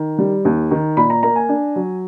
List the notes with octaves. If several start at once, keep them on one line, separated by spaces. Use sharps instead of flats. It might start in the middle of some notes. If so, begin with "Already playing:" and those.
Already playing: D#3
G3
D#2
D#3
A#2 B5
A#5
A#3 A#5
G#5
D4
F#3